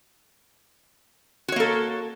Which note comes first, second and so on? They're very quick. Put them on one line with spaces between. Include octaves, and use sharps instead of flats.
F#4 C#5 A#3 A4